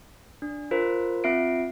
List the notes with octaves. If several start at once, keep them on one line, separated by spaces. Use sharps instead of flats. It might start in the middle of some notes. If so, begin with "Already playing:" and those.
D4
F4 A#4 C5
C4 F4 E5 C7 D7